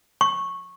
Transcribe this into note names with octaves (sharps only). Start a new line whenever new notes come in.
C#6